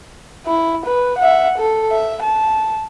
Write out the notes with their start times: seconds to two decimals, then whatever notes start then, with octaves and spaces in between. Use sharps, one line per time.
0.46 E4
0.86 B4
1.18 E5 F#5
1.58 A4
1.91 E5
2.23 A5